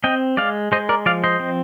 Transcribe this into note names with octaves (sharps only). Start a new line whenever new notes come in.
C4 D#5 G5
G#3 D5 F5
G#3 C5 D#5
A#4 D5
F3 D5 F5
C5 D#5
C4